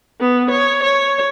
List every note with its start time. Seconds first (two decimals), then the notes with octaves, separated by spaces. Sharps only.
0.20 B3
0.51 C#5
0.83 C#5